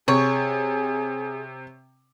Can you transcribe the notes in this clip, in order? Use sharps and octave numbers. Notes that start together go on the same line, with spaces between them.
C3 G#4 C#5